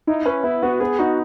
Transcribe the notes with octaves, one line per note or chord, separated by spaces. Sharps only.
D#4 E4
C#4 B4
B3 E4
B3 F#4
B3 G#4
D#4 F#4